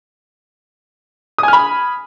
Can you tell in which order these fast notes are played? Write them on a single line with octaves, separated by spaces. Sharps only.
D#6 G#5 F6 B5